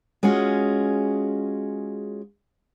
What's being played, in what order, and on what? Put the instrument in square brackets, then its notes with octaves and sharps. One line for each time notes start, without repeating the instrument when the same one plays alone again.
[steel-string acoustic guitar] G#3 C#4 F4 F#4 G#4